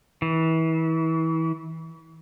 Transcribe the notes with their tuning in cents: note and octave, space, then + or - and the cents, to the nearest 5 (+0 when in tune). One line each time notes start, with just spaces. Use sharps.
E3 -30